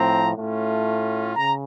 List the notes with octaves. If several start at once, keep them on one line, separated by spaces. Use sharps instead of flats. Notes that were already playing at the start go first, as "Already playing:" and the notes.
Already playing: A2 F3 C4 A#5
A2 A3 C#4 F4
C#3 A#5